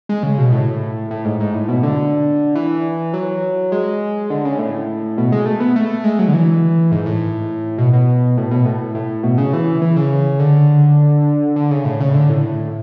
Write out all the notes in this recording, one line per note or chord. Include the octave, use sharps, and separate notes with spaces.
G#3
C#3
B2
A2
A2
G#2
G#2
A2
B2
D3
E3
F#3
G#3
D3
C#3
A2
B2
G#3
A3
B3
A3
G#3
F#3
D3
E3
G#2
A2
B2
B2
A2
B2
A2
A2
B2
C#3
E3
E3
C#3
D3
D3
C#3
A2
C#3
D3
A2